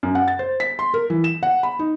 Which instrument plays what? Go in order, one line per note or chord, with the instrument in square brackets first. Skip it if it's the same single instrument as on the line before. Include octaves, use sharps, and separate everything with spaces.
[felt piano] F#2
F#5
A6
C5
B6
C6
A#4
E3
E7
F#5
B5
D#4